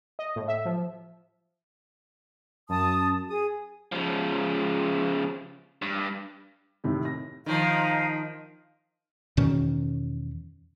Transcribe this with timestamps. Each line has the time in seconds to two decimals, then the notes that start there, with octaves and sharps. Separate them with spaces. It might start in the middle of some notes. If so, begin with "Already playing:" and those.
0.19 D#5
0.36 A2
0.48 E5
0.65 F3
2.69 F#2 A5 D#6
3.30 G#4 D#6
3.92 C#3 F3
5.82 G2
6.84 A2 C3 D#3
7.05 A#6
7.46 D#3 F3 D#4 F5
9.37 E2 B2 D#3 C#4